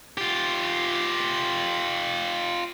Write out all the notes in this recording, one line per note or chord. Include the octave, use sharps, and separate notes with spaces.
F4 G4